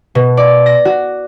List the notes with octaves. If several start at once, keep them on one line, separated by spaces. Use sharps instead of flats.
B2
D5
A#6
F#4